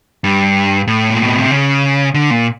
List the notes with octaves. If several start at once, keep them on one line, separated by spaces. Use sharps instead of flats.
G2
A2
A#2
B2
C3
C#3
D3
A#2